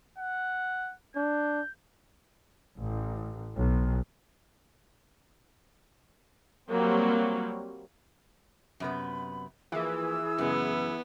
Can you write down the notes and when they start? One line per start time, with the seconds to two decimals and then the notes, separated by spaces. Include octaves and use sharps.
0.18 F#5
1.16 D4 G6
2.78 A1
3.55 B1
6.70 F#3 G3 A#3 C4
8.80 F#2 C3 B3 B5
9.72 E3 F3 A#3 G#4 E6
10.38 F#2 C#3 G#3 B3